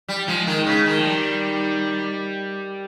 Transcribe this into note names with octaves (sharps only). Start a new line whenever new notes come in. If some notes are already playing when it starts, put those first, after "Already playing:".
G3
F3 G#3
D#3
C#3
D#3
F3
G3